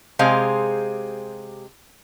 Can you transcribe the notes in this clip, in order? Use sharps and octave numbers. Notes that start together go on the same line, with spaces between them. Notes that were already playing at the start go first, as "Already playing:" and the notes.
C3 G#3 G#4 C5 F5